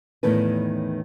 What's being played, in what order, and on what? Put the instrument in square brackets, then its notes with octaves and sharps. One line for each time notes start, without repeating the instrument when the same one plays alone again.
[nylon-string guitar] E2 A2 D#3 C#4 A4 B4